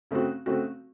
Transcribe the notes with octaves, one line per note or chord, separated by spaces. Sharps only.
C#3 A3 C4 F#4
C#3 A3 C4 F#4